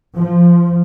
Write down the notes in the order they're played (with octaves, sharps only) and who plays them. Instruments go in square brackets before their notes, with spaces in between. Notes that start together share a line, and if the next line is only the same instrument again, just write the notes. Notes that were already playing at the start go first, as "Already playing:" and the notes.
[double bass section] F3